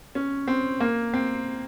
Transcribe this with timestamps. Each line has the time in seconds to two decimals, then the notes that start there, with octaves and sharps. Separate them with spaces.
0.15 C#4
0.48 C4
0.80 A#3
1.14 C4